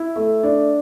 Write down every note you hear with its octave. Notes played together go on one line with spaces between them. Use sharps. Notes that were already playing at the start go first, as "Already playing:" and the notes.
Already playing: E4
A3
D4